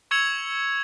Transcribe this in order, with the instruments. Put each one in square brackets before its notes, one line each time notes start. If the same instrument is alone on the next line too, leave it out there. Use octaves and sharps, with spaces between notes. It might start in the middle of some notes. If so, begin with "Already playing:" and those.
[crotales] C#6 E6 G#6 C#7 F7 F#7